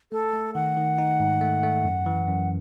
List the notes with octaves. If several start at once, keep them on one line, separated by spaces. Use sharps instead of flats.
A3 A4
A3
D#3 F#5
D#3
D#4
G#2
A3
A3
F#2
E3
F#2